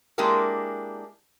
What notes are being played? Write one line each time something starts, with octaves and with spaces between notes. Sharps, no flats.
G#3 A#3 D4 E4 G4 A#4